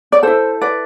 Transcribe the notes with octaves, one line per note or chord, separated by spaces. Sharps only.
D5
E4 A4 C5
B4 D5